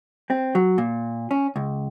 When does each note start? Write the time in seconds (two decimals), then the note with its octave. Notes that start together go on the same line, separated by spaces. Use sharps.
0.30 C4
0.55 F#3
0.78 A#2
1.31 C#4
1.56 C#2